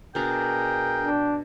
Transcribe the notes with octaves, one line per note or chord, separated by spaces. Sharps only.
B2 D4 G#4 A#4 G5 A#5
D4